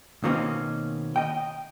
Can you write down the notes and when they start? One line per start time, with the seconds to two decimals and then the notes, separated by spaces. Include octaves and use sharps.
0.24 B2 D#3 A#3 C4 C#4
1.16 D#5 G5